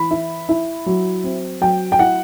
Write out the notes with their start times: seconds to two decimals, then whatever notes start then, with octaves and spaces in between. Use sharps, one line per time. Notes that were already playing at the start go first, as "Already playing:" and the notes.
Already playing: E3 B5
0.11 E4
0.49 E4
0.86 F#3
1.24 C4
1.61 F#3 G5
1.92 G5
1.99 E4 F#5